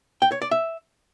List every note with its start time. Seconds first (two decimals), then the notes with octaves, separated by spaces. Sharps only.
0.22 G5
0.32 C#5
0.42 D5
0.51 E5